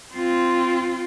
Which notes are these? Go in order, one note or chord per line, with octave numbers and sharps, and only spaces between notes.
C4 F4